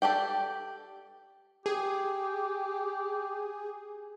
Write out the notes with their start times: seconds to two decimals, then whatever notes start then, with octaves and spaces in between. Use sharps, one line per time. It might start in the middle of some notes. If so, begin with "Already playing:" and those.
0.02 G4 A4 D5 G5
1.66 G4 G#4